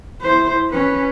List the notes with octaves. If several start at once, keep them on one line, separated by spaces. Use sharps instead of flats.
E4 C5
C#4 B4